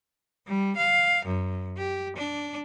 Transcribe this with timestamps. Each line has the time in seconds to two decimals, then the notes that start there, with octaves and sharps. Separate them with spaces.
0.47 G3
0.77 F5
1.26 F#2
1.77 G4
2.16 D4